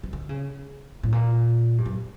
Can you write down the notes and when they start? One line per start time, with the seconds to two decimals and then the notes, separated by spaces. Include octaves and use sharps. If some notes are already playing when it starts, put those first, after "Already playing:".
0.03 D#3
0.13 D3
0.29 C#3
1.03 A2
1.12 A#2
1.78 G2
1.86 F#2